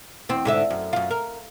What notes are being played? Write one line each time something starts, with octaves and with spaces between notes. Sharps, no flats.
E2 C4
G#2 D3 E5
F#2
F#2 F4
A#4